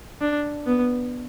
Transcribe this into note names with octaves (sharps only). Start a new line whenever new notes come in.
D4
B3